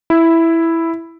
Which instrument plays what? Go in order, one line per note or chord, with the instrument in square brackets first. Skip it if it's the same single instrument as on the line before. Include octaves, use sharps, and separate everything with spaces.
[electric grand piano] E4